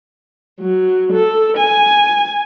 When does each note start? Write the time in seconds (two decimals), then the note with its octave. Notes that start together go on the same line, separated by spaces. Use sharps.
0.59 F#3
1.11 A4
1.57 G#5